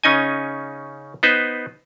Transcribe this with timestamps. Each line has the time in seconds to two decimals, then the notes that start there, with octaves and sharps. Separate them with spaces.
0.04 C#3 C#4 D#4 D#5 G#5
1.23 B3 D#4 B4 C5